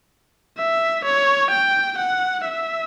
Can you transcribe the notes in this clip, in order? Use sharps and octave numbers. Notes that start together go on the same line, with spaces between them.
E5
C#5
G5
F#5
E5